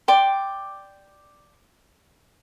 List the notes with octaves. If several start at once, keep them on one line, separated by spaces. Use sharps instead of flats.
D5 G5 C6